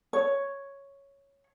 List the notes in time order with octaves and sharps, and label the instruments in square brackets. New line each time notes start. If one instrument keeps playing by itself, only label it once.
[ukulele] C#5